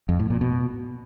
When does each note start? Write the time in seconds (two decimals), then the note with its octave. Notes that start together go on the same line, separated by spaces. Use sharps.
0.09 F2
0.19 A2
0.30 A#2
0.41 B2